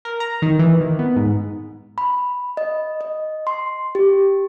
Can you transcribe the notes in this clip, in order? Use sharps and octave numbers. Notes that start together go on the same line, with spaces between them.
A#4
A#5
D#3
E3
D#3
B3
G#2
B5
D#5
D#5
C6
G4